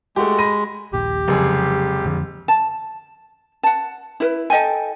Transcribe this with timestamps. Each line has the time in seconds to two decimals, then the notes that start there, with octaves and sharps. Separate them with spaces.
0.16 G#3 A3 F#4 G4
0.39 B5 A#6 D#7
0.93 D#1 A#1 G4
1.28 F1 C#3 F#3 G#3 G#4
2.05 F2 D3 F3
2.48 A5
3.63 F#5 A5
4.20 E4 A#4 B4
4.50 A4 D#5 G5 G#5